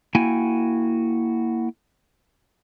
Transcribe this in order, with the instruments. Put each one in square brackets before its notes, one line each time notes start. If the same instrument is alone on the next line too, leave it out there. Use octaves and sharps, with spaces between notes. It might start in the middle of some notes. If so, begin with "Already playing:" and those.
[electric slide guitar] A#3 E4 F#4 G5 G#5